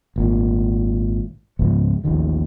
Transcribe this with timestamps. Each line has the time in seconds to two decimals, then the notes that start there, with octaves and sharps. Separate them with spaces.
0.16 G#1 A#2
1.59 C#2 G#2 F3 B3
2.04 A1 D#2 D#3 F3